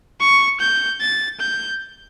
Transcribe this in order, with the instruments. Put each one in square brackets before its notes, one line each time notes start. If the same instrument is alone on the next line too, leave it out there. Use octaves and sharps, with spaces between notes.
[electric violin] C#6
G6
A6
G6